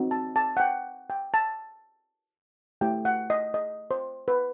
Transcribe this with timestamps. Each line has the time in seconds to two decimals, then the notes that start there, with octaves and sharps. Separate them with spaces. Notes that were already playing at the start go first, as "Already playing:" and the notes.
Already playing: C4 D#4 F#4
0.11 A5
0.36 A5
0.57 F#5
0.60 G5
1.10 G5
1.34 A5
2.81 A3 E4 G4 G5
3.05 F#5
3.30 D#5
3.54 D#5
3.91 C5
4.28 B4